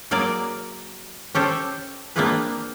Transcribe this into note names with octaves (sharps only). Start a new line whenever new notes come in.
F#3 A#3 G#4 A#4 D5
C#4 G4 A4 C5
A#3 C4 D4 F4 G#4 B4